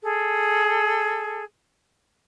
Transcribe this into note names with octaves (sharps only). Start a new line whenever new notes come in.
G#4 A4